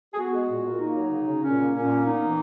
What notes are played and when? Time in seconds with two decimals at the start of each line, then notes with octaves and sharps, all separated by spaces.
0.13 G#4
0.18 B3 F#4
0.34 G#3
0.49 A#2
0.65 A#2
0.80 A#3 D#4
0.96 F#3
1.11 C#3
1.27 C#3
1.42 A#2 C#4
1.57 A#3
1.74 A#2 C#4
1.89 A#3
2.04 B3 D#4
2.19 E3